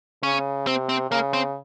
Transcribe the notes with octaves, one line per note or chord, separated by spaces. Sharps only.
C#3 C#4
C3 C4
C4
C#3 A#3
C4